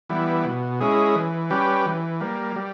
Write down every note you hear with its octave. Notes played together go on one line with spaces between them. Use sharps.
E3 G3 B3 E4
B2
G#3 C#4 E4 G#4
E3
G3 C#4 G4 B4
E3
G3 A#3
G3